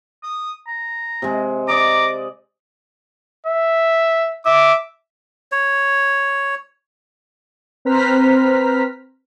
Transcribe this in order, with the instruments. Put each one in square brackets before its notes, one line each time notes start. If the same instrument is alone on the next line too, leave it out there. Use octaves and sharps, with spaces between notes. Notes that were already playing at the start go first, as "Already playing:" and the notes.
[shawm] D#6
A#5
[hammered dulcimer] C3 G#3
[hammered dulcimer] D5 D#5 [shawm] A#5 [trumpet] D6
[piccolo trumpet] E5
[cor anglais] E5 [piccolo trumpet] D6
[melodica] C#5
[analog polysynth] C4 B4 C5 A#5 F6 B6